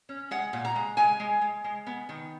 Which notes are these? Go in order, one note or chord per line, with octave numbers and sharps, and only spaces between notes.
C#4
G#3 F#5
A#2
A#5
G#3
G#3 G#5
G#3
G#3
G#3
B3
D#3